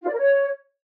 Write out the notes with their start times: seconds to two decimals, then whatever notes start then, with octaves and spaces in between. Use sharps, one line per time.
0.02 F4
0.07 D5
0.13 A#4
0.18 C#5